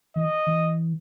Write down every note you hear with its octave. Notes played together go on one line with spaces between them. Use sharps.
E3 D#5
E3